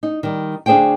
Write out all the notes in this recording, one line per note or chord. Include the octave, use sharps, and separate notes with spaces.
D#4
D#3 G3
D2 D4 G#4 C5 F5 G5